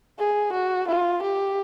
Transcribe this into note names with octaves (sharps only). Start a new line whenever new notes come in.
G#4
F#4
F4
G4